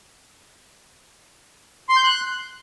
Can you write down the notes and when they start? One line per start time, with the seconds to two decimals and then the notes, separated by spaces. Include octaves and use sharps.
1.89 C6
1.97 G6
2.04 F#6